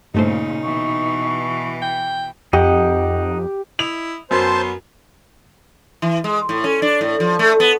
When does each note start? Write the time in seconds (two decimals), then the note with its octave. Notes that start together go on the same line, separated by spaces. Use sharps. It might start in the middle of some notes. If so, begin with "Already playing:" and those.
0.15 G2 A#2 C#3 A3 D#4 C5
0.63 B2 E3 C#6
1.82 G5
2.53 F2 D#4 G4 D#5 F#5
3.79 E4 D#5 E5 F7
4.31 F#2 B3 C#4 C5 A5 C6
6.02 E3
6.24 G#3
6.49 A2
6.64 C#4
6.82 D4
7.01 A2
7.20 F3
7.39 A3
7.60 B3